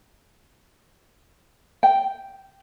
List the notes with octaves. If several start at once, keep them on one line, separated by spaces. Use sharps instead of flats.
G5